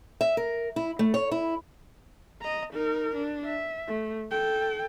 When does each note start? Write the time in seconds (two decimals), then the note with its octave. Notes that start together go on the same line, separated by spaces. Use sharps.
0.21 E5
0.37 A#4
0.76 E4
0.99 A3
1.14 C#5
1.32 E4
2.42 D#5 A#5
2.73 D#4 A#4
3.15 D4
3.45 E5
3.87 A3
4.31 A4 G5